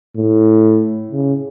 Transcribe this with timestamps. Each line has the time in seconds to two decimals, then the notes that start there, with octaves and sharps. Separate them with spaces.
0.17 A2
1.11 C#3